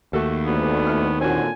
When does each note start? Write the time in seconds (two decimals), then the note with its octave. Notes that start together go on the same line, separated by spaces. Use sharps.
0.13 D#2 A3 F#4 A4
0.46 D2 B3
0.87 A2 F6
1.21 A#2 D3 C4 C#4 F#4 G#5